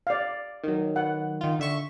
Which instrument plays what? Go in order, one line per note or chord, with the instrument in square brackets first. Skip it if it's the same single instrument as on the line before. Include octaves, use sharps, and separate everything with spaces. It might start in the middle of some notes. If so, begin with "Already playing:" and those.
[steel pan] D5 F5
[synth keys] D#3 F#3
[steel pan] F#5
[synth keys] D#3 F4
D3 E5 C#6